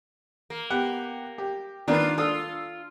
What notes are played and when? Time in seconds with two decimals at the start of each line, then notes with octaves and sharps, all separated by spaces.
0.50 A#3
0.70 B3 G4 F#5
1.38 G4
1.88 D#3 A#3 D4 F4 B4
2.18 F4 A4 D#6 E6